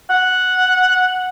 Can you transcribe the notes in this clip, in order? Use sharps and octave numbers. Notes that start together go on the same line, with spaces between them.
F#5